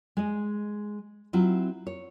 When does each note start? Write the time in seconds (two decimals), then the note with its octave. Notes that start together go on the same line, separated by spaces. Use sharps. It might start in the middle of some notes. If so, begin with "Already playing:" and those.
0.17 G#3 D#5
1.33 F#3 C4 E4 F4
1.87 C#5